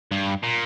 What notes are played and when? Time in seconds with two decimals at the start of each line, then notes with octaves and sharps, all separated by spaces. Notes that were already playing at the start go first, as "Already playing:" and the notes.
0.11 G2
0.43 A#2